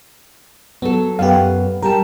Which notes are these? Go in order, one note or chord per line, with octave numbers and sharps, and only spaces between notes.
F#3 B3 A4
F#2 B3 G4 F5
G3 G4 A#4 A5